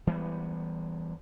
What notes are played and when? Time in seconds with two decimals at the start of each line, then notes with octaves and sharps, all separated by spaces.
0.07 E3 G3 G#3 B3